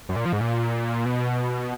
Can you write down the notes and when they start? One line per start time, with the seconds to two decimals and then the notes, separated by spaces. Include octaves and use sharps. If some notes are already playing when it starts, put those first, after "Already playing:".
0.09 F#2
0.16 A#2
0.25 F3
0.33 G#2
0.41 A#2
1.05 B2